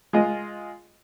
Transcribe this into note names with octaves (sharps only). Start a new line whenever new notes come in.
G#3 F4 D#5